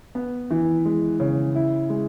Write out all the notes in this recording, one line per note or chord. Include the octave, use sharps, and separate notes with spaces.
B3
E3
G#3
C#3
E4
G#3